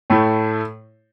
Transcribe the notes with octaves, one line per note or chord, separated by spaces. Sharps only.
A2 A3 E4